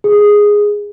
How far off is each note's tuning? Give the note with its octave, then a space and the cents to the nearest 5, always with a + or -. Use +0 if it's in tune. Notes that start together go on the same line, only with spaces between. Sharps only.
G#4 -5